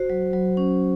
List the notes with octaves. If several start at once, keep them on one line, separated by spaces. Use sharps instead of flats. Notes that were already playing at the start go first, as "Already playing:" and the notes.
Already playing: F#4 C5
F#3
F#3
C#4